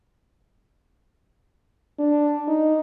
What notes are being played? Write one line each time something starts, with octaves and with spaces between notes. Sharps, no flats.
D4
D#4